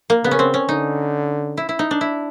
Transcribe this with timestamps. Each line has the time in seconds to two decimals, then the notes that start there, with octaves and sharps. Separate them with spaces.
0.10 A#3
0.24 C#3 B3
0.31 C#4
0.39 C4
0.54 C#4
0.69 D3 D#4
1.57 E4
1.69 E4
1.79 D#4
1.91 D4
2.01 E4